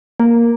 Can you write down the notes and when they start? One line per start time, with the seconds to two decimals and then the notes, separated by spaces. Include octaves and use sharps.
0.20 A#3